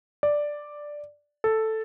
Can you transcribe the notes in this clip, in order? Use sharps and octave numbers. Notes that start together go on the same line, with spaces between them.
D5
A4